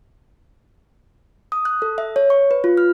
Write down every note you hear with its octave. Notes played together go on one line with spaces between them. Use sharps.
D#6
F#6
A4
E5
C#5
C#6
B4
F4
F6